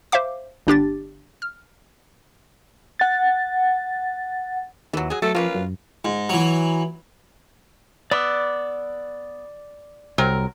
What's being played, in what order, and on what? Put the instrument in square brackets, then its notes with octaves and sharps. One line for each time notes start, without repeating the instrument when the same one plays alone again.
[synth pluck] C5 E5 F5 D6
G1 D4 G4 A6
F6
[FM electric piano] F#5 A6
[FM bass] D#2 [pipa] E3 F#3
[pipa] F#3 G#4
[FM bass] F#3 [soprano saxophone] A3 [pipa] A4
[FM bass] F3 [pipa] A#3 C#4 B4 [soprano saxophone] F4
[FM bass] F#2
[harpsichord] G#2
E3 F#3
[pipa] B3 [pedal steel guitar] D5 D6 E6
[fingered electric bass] C2 [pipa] F#3 C4 A#4